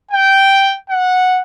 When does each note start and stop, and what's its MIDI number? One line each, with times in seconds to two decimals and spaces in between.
0.12 0.74 79
0.90 1.41 78